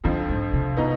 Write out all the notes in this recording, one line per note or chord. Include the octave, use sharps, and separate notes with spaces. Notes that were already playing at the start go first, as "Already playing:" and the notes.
F2 D3 D#3 F3 C4
G#2
C3
B2 B3 D#4